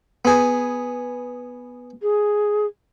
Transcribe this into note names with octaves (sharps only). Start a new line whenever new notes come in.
B3 G#4
G#4